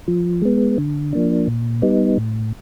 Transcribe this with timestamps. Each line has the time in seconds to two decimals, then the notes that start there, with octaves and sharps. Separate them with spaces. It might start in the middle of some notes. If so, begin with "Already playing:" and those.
0.08 F3
0.42 G#3 B3
0.78 D3
1.13 F3 A#3 D4
1.47 A#2
1.82 G3 B3 D#4
2.17 A2